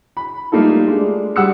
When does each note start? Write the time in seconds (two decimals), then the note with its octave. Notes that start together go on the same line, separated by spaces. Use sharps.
0.17 B5
0.52 G3 A3 A#3 D#4 F4 A4
0.87 G#3 D4
1.36 G3 F#5 E6 C#7